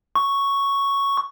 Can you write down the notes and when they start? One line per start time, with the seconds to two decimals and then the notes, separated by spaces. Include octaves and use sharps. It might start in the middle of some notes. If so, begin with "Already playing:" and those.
0.15 C#6